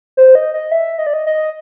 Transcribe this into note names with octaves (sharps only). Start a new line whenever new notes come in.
C5
D#5
D#5
E5
D#5
D5
D#5
D#5